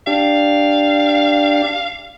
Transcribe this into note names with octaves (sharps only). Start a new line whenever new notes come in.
D4 G4 F5